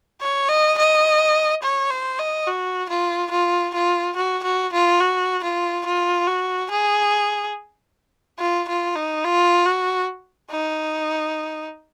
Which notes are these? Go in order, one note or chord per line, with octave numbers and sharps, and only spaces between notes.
C#5
D#5
D#5
C#5
C5
D#5
F#4
F4
F4
F4
F#4
F#4
F4
F#4
F4
F4
F#4
G#4
F4
F4
D#4
F4
F#4
D#4